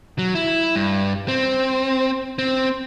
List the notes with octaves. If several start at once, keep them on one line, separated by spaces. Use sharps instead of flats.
F#3
E4
G2
C4
C4